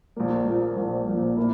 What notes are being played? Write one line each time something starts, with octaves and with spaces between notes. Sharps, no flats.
A#1 A#2 F3 A#3
A#1 A#2 F3 A#3
A#1 A#2 F3 A#3
A#1 A#2 F3 A#3
A#3 E4